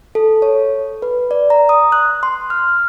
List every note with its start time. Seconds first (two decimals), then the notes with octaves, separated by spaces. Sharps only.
0.15 A4
0.42 C#5
1.02 B4
1.31 D5
1.50 A#5
1.69 D#6
1.92 F#6
2.23 C6
2.50 F6